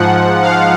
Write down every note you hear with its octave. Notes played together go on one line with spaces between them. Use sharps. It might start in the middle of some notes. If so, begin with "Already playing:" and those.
Already playing: G#2 F3 F#5
F5